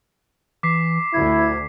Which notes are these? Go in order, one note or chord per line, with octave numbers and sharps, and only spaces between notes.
E3 D6 B6 C7
D2 E4 G#6